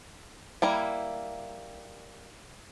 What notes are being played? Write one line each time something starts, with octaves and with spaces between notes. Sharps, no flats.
G3 A#3 E4